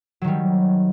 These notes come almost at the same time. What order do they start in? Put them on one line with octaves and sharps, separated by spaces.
F#3 D#3 G3